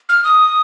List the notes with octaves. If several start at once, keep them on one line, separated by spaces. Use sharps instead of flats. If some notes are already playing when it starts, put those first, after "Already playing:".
F6
D#6